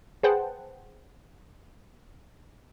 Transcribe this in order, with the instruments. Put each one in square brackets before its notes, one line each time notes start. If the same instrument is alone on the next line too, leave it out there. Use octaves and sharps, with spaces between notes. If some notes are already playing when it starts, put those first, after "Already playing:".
[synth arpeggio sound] G#4 B4 C5 F#5 G5 A5